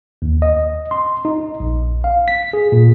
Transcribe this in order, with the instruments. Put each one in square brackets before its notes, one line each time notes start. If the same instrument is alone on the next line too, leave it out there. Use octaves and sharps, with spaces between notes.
[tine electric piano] D#2
D#5
C6
D#4
A#1
F5
B6
G#4
A#2